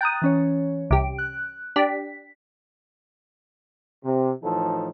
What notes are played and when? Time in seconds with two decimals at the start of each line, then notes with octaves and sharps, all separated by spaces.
0.01 G5 A#5 D#6 F#6 A6
0.22 E3 C#4 C#5
0.91 C2 G4 D7
1.18 F#6
1.76 D4 G4 B6
4.04 C3
4.42 A2 E3 F3 D#4 A4